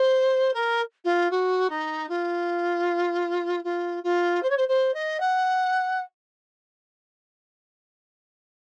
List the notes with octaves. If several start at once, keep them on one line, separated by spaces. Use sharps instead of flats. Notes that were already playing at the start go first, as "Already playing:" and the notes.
Already playing: C5
A#4
F4
F#4
D#4
F4
F4
F4
C5
C#5
C5
C5
D#5
F#5